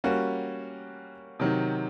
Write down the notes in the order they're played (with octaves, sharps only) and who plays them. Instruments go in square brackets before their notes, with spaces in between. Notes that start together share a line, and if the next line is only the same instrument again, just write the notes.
[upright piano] G3 A#3 C#4 F#4
C3 D#3 F#3